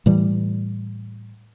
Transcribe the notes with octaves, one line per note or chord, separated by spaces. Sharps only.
A2 E3 G3